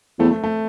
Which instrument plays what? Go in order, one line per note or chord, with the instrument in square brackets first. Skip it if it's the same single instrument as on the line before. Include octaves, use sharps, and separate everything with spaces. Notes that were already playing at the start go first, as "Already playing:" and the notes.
[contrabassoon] E2 [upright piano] A3 C4
[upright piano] A3
A3